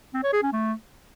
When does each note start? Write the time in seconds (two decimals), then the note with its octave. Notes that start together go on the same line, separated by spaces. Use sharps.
0.14 C4
0.23 C#5
0.33 G#4
0.43 C#4
0.52 A3